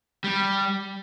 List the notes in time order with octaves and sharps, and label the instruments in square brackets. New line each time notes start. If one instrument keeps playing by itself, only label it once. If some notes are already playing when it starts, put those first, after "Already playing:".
[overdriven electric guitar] G3